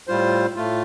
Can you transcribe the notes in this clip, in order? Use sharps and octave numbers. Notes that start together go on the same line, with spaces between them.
A2 G3 F4 C5
A2 A3 F4